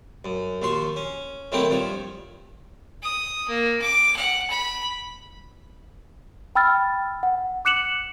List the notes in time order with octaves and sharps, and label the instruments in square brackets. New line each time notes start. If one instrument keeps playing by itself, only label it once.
[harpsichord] F#2
D#2 F3 C6 C#6
C#4
D#3 F#3 A3 C4 E4 G4
G2 F3 C#5
[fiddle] D#6
A#3
D6
F#5
B5
[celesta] G5 B5 E6 F6 A6
F#5
D6 F#6 C#7 E7 F#7